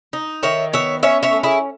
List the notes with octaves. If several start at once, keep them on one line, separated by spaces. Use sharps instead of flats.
D#4
D#3 C#5 E5
B3 C#5 E5
C#4 C#5 E5
C#5 E5
A3
E4 G#4